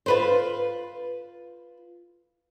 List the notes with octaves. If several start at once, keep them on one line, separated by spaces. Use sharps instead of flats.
F4 B4 C5